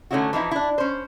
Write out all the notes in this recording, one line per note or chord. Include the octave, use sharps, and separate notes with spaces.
D3 A3 C#4 D#4 E4 F#4
E3 F3 D#4 E4
D4 E4
C#4 C5